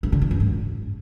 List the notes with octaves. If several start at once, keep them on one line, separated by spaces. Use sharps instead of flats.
G2
D3
A#2
F#2
G#2